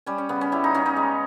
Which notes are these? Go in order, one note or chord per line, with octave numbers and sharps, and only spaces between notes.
G3 C#4
C#4
C#3 B3
C#4
G3 E4
D#4
C#3 C#4
D#4
G#3